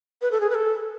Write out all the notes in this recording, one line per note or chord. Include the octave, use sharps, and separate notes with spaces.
B4
A4
G#4
B4
A4